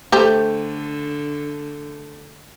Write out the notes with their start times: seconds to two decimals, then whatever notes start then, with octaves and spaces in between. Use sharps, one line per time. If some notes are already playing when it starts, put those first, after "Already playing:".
0.12 D3 A3 G4 C5